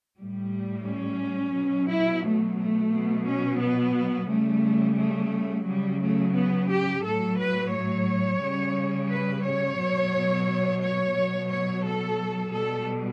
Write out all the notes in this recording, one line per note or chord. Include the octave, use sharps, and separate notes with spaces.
A2 G3
C#4
B2 F#3
E4
A3
A3
B2 F#3
C#4
B3
C#3 G3 A3
A3
C#3 F#3 G3
A3
B3
G4
A2 F#3 A4
B4
C#5
C#3 G3
B4
C#5
B2 F#3
C#5
B2 F#3
C#5
A4
B2 G3 A4